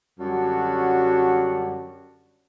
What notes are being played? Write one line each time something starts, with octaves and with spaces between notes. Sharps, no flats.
F#2 D3 F#3 G3 F#4 A5